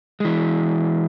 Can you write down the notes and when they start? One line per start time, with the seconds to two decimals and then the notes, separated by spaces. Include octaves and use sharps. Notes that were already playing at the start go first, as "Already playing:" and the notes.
0.20 E3 G#3